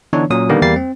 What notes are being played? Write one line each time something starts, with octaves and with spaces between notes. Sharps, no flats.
D3 E3 B3 D4 D#4 C#5
A#2 F#3 C#4 D#6
D3 D#3 G3 A#3 B3
E2 G3 A#3 A6 C7
C4